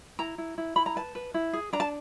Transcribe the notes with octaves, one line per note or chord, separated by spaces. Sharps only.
E4 A#5
E4
E4
E4 B5
A#5
B4 A5
B4
E4
G#4
D4 A#5
A5